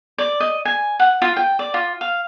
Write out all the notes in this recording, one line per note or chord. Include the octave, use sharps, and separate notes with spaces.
D5
D#5
G#5
F#5
F4
G5
D5
F4
F5